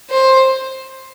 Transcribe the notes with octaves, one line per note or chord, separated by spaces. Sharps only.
C5